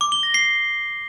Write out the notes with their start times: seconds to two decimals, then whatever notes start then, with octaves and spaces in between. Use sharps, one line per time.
0.01 D6
0.12 G7
0.23 A#6
0.34 C7